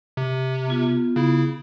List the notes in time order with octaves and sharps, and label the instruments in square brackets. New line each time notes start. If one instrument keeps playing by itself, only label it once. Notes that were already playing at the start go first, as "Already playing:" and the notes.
[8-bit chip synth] C3
[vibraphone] B3 F4
[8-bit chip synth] C#3 E4